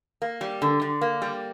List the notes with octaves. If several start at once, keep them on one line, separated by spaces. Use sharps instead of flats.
A#3
G3
D3
D3
A#3
G3